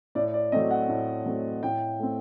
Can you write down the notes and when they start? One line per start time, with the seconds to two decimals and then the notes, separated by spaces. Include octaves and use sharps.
0.15 A2 D5
0.34 D5
0.52 F#3 A3 C4 D#5
0.71 F#5
0.89 A2
1.26 F#3 A3 C4
1.63 A2 G5
1.99 A3 C4